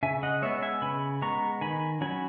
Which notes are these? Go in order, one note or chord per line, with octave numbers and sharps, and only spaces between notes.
C#3 E5 G#5
D#5 F#5
G#3 B3 C#5 E5
E5 G#5
C#3 G#5 B5
G#3 B3 A#5 C#6
D#3 G#5 B5
F#3 C#4 G#5 B5